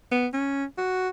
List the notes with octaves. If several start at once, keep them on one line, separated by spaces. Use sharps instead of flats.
B3
C#4
F#4